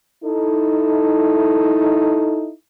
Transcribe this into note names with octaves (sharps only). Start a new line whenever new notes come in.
D#4 E4 A4